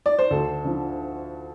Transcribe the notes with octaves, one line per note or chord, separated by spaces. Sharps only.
D5
C5
D2 A4
D3 F3